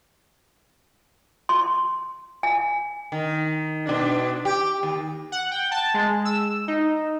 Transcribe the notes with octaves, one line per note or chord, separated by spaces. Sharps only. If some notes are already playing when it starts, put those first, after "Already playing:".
C6
G#5
D#3
B2 D4
G4
D#2
F#5
G5
A5
G#3
E6
D#4